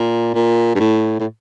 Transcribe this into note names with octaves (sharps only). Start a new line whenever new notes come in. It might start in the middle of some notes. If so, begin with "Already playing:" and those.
Already playing: A#2
A#2
G2
A2
A2